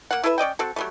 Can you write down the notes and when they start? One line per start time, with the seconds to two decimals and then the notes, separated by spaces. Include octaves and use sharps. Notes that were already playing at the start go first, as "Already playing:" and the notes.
0.11 A#3 F#5
0.24 E4 A4 B4 E5
0.38 C#4 D5 D#5 G5
0.59 C4 F#4 A4
0.76 F#3 G3 A3